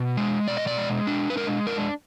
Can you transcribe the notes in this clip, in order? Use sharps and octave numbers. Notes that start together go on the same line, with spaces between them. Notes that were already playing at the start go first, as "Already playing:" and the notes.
Already playing: B2
G#3
B2 D5
D#5
D5
G#3
D4
B4
G#3 A#4
D4 A#4